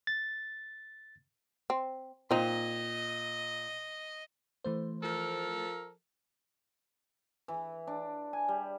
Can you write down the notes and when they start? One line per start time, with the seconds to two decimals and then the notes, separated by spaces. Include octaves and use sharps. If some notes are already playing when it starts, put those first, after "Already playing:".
0.07 A6
1.70 C4
2.31 A#2 C4 D#4 D#5
4.64 E3 A3 C5
5.02 F3 A4 A#4
7.48 E3
7.87 D4
8.33 G#5
8.48 G3